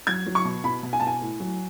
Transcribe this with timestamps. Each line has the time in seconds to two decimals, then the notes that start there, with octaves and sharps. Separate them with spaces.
0.07 F#3 G#6
0.26 F#3
0.35 C#6
0.45 B2
0.64 B2 B5
0.83 B2
0.93 G#5
1.00 B2 A5
1.07 G#5
1.21 A2
1.40 F#3